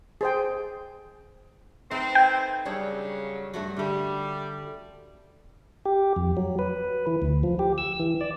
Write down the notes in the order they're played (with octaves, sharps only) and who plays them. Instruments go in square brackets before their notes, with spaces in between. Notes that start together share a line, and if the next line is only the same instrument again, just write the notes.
[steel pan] G#4 C5 G5
[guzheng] A3 D#4 B4 [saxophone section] C4
[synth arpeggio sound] G5
[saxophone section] C#3 F#3 [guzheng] G3 D4 C#5
[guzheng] G2 A3 F#4
[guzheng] D3 A3 [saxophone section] G3
[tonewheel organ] G4
F2
F#3
B4
E3
D2
F3
G4
E6
E3
D5